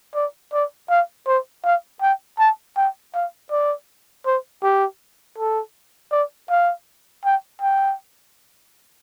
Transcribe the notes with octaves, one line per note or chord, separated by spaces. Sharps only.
D5
D5
F5
C5
F5
G5
A5
G5
F5
D5
C5
G4
A4
D5
F5
G5
G5